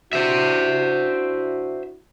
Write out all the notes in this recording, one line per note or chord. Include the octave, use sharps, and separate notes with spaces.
D4 E4 F#4 C5 E5